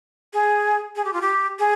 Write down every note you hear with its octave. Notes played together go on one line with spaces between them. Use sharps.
G#4
G#4
G4
F4
G4
G#4